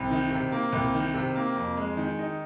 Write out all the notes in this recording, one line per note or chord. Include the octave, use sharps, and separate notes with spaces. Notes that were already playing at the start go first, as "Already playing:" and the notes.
Already playing: C2
D#3
C3
A#3
C2
D#3
C3
A#3
F2
G#3
D#3
D#4